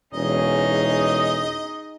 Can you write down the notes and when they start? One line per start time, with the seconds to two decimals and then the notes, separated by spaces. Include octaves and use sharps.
0.14 E1 C#4 D#4 G#4 D#5